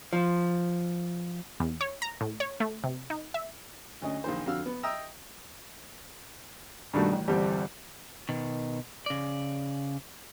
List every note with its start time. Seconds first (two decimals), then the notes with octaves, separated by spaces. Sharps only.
0.13 F3
1.60 E2
1.81 C#5
2.02 A#5
2.21 A2
2.40 C#5
2.60 A3
2.84 C3
3.10 D#4
3.34 E5
4.02 D2 C#4 D#5
4.24 A#1 D#3 C5
4.46 F2 D3 F#4 F5 E6 F6
4.66 B3
4.83 D#5 E5 G5 A#5 D#6 E6
6.93 G2 B2 D#3 G3 A3
7.13 A1
7.28 G1 E2 G3 C4 G4 A5
8.29 B2 D#3
9.06 C#3 D5